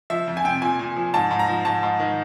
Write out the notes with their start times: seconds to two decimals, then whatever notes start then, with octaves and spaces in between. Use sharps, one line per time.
0.10 F3 E5
0.28 F2
0.37 G#5
0.45 C3 G5
0.62 A#2 G#5
0.79 A#2
0.96 F3
1.14 G#2 A5
1.31 G#2
1.39 A#5
1.48 F3
1.65 G#2 A5
1.83 G#2
2.00 D#3